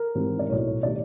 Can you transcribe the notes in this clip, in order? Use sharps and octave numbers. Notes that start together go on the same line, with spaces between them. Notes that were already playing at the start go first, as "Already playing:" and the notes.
Already playing: A#4
G#2 E3 G3 C4
D5
B1 A2 F#3 A3 C#5
D#3 G3 D5